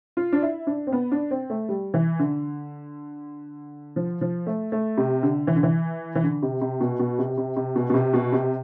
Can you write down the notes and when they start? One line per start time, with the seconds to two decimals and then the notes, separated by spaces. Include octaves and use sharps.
0.17 F4
0.33 D4
0.42 E4
0.67 D4
0.87 C4
0.93 B3
1.12 D4
1.31 C4
1.50 A3
1.69 G3
1.94 E3
2.19 D3
3.96 F3
4.21 F3
4.47 A3
4.72 A3
4.98 C3
5.23 D3
5.47 E3
5.56 D3
5.63 E3
6.15 E3
6.23 D3
6.42 C3
6.61 C3
6.81 B2
6.99 B2
7.19 C3
7.38 C3
7.56 C3
7.76 B2
7.90 B2
7.94 C3
8.14 B2
8.32 C3